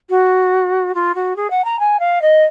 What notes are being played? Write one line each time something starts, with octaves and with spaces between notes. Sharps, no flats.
F#4
F4
F#4
G#4
F#5
A#5
G#5
F5
D#5